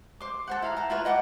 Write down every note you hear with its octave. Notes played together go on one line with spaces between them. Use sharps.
C5 D6
A4 C5 F#5
E4 F5 A#5
A5 A#5
E4 F4 B4 C#5
D#5 F#5 G5 D6